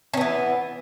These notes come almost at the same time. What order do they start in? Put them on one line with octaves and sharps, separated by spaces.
C#4 B3 E3